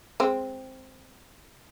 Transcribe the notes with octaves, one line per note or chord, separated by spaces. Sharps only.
G#3 C4